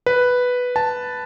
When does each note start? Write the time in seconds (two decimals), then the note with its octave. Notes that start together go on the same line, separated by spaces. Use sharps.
0.06 B4
0.76 A5